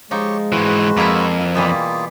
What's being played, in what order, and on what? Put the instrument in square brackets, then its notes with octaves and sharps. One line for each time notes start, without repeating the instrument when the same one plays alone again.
[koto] F3 D#4 [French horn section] G#3 [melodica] G4 C#5
[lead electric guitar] G#2 E3 [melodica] F#4 B4 C5
[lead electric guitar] F2 [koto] A#3 E4
[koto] B2 E3 G3 [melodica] A#3 F4 G#4